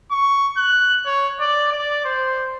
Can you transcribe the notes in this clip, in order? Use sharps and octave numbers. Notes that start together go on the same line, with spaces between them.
C#6
F#6
C#5
D5
D5
C5